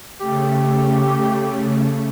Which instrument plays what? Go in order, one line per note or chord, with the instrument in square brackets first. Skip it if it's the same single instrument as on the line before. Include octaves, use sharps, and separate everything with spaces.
[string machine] C#3 A3 [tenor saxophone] G4